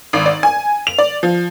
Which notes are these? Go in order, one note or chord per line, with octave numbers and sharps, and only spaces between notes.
G#1
D5
G#5
F7
D5
F3